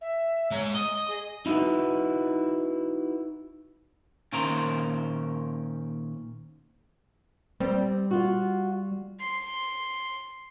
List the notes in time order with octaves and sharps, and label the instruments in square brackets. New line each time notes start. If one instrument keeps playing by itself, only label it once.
[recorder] E5
[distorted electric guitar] G#3 A#5 [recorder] C#5
[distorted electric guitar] D#5 [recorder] D#6
[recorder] G#4
[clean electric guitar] D#4 E4 F#4 B4
A#2 D#3 C#4 A#4 C5 A#5
[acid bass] G3 [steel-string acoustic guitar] C4
[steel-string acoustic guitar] F4 F#4
[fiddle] C6